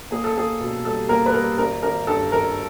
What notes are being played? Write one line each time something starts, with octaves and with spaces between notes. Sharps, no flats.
A#3 G#4
A4
A#3 G#4
B2
G3 A4
A#3 A#4
B4
G3 A#4
G#1 A#4
G#1 A#4
G2 A4
G#1 A#4